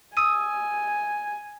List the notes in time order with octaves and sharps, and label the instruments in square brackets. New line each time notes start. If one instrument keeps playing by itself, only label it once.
[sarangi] G#5 [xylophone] D#6 E6 D#7